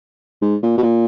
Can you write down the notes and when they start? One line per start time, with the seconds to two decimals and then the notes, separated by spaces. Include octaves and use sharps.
0.42 G#2
0.63 A#2
0.77 B2
0.83 A#2